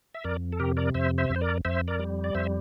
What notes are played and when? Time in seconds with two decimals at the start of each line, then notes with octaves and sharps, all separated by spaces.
0.14 E5
0.24 F2 A#4 D5
0.53 A4
0.60 C3 G4 A#4
0.77 A#4 D5
0.94 F2 C5 E5
1.18 C5 E5
1.30 F2
1.36 C5
1.41 A#4 D5
1.65 F2 C5 E5
1.88 A#4 D5
1.99 G3
2.24 D5
2.35 F2 C5 E5